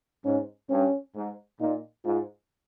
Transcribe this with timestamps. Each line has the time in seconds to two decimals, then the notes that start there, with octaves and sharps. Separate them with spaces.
0.25 G#2 C#4
0.70 G2 C#4
1.16 G#2
1.60 A#2 D#4
2.05 G#2 F4